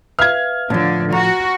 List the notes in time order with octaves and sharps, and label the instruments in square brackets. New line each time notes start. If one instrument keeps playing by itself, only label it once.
[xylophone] B4 E5 F5 [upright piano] F6 G#6
[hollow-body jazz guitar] A2 F3 [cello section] D3
[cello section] F#4 [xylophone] A#5